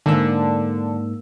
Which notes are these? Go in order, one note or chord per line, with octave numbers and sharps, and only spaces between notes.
G#2 D3 A#3 E6